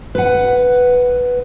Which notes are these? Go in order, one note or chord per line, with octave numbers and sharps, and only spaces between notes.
B4 F#5